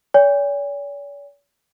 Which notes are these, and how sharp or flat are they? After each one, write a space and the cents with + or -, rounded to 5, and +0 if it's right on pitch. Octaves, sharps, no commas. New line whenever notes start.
C#5 +45 G#5 -45